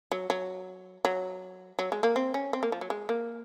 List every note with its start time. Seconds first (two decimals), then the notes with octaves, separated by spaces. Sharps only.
0.12 F#3
0.30 F#3
1.05 F#3
1.79 F#3
1.92 G#3
2.03 A#3
2.16 C4
2.34 C#4
2.53 C4
2.63 A#3
2.72 F3
2.81 F#3
2.90 G#3
3.09 A#3